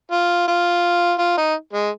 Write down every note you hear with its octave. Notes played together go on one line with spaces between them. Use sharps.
F4
F4
F4
D#4
G#3